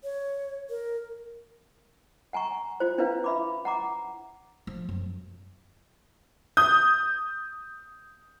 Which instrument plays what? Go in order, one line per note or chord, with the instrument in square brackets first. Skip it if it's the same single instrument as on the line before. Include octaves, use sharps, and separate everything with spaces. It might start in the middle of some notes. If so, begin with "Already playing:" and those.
[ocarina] C#5
A#4
[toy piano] F#5 G#5 A#5 C#6
F4 C5
C#4 D4 E4 F4 B4 F5
E5 B5 D6
F#5 A#5 D6
[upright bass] F3
F#2
[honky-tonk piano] D#6 G6